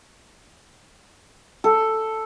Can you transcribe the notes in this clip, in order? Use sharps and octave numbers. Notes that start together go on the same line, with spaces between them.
A4